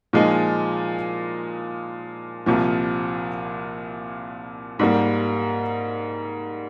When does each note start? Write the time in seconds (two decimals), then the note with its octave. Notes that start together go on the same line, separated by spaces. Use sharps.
0.13 A#2 F3 G#3 D#4
2.46 C2 A#2 F3
4.79 G#2 G3 A#3